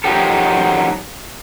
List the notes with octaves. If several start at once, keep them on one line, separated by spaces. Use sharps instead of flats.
D#3 F3 F#3 G4 A4